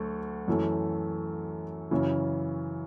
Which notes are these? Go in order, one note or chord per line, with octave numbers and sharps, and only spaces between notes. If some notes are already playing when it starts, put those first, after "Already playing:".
Already playing: D2 F#3 A3
F#2 E3 A3
F#2 C#3 E3